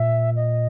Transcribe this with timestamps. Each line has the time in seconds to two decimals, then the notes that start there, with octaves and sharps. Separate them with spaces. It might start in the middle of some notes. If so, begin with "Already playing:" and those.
Already playing: A#2 E5
0.36 D#5